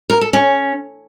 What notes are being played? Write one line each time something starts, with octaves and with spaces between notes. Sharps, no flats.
A#4
A4
C#4